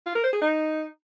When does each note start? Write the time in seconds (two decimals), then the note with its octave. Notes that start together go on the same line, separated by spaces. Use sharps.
0.06 F4
0.15 A#4
0.24 C5
0.33 G#4
0.42 D#4